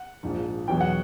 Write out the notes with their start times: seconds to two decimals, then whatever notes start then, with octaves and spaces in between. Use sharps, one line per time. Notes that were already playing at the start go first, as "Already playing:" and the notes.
Already playing: F#5
0.23 A#1 G#2 F3
0.68 E2 B2 F#3 G5
0.81 F#5